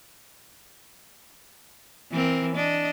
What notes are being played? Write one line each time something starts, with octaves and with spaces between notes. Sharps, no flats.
E3 C4 A#4
D4 D#5